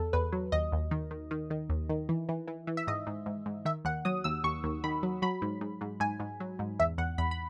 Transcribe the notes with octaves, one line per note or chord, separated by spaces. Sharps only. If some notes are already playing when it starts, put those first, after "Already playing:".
Already playing: E2 A4
E2 B4
F#3
D#2 D#5
D#2
D#3
D#3
D#3
D#3
D#2
D#3
E3
E3
E3
E3
E5
G#2 D#5
G#2
G#2
G#2
D#3 E5
D#2 F#5
F#3 D#6
D#2 E6
D#2 C#6
D#2
D#3 B5
F#3
F#3 B5
G#2
G#2
G#2
G#2 G#5
G#2
F#3
G#2
E2 E5
E2 F#5
E2 B5
B5